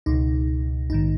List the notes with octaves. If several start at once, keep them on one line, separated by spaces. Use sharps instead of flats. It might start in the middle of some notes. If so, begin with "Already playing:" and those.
C#2 B2 D#4
A#1 G#2 D#3 D#4